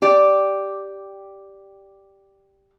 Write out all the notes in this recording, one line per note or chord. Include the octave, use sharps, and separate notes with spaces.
G4 D5